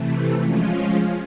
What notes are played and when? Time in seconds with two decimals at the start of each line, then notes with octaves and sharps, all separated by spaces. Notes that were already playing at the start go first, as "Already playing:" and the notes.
Already playing: C3 E3 A3
0.40 F3 G#3 C#4 F4